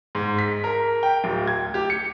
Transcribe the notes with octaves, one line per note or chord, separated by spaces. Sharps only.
G#2
B6
A#4
G5
D1
G#6
G4
C#7